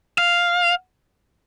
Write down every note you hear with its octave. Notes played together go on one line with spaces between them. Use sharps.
F5